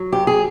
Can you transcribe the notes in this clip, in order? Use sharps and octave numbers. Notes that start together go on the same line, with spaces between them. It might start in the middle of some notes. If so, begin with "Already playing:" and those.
Already playing: F#3
F#2 G4
G#4